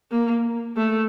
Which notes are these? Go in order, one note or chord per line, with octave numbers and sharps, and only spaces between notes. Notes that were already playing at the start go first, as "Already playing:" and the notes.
A#3
A3